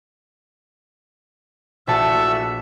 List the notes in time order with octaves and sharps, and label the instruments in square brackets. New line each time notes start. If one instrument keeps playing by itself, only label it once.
[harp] A#1 A5 [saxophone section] E3 A3 F#4 [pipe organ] E5